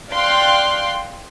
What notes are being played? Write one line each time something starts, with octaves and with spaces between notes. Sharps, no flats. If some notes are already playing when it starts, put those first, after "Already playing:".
D5 F5 G5 C6 F#6